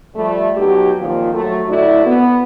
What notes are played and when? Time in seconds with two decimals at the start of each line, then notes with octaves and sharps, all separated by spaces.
0.16 F3 G3 A3
0.57 B2 F#3 D#4 G4
0.99 F2 A#2 D#3 F3
1.34 F#3 A3
1.68 D2 A2 D3 D4 E4 F#4
2.05 B3